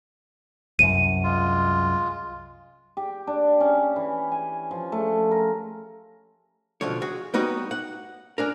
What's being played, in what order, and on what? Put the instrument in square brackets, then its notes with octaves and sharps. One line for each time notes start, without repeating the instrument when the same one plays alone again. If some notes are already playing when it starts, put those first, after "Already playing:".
[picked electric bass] C2 F#2 [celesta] D#7
[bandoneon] G#3 F4
[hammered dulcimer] G4
D4
C#4
E3
G#5
F3
A3
A#4
[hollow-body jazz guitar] C#2 B2 D3 F3 C#5
F#4 G#4
G3 B3 D#4 F#4 C#5
F#5
C#4 D4 A#4